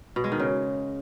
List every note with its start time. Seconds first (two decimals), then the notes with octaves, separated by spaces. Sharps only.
0.16 B2
0.24 G#3
0.32 D#3
0.40 C#3